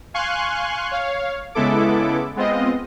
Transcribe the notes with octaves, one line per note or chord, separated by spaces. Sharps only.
F5 G#5 C6 C#6 F#6
C#5 F5
C#3 G#3 B3 E4 A4 D6
G#3 B3 C4 F4 D#5